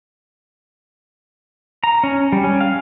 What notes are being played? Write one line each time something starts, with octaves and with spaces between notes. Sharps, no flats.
A#5
C#4
G3
C#4
F5